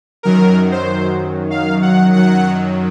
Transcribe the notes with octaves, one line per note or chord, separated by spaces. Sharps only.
F#2 D#3 F#3 A#4
C5
F5
F#5
F#2 D#3 F#3 F#5